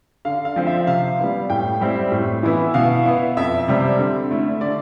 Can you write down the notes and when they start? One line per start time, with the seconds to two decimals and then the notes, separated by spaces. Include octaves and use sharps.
0.25 D3 F5
0.45 F5
0.56 F3 C4
0.67 E5
0.87 C3 F5
1.19 G3 B3 E4
1.50 A2 G5
1.81 G3 C4 E4
2.12 A2
2.43 E3 B3 E4
2.74 B2 F5
3.05 B3 E4
3.37 F2 E5
3.68 C3 G3 C4
3.99 D3
4.31 A3 E4
4.61 D3 D5